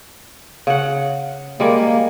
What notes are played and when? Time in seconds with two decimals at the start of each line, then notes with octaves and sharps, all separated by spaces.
0.67 C#3 F#5
1.60 G3 G#3 A#3 D5